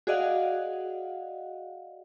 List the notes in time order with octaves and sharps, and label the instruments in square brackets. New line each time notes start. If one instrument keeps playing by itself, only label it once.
[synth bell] F#4 G#4 D5 D#5 F5 F#5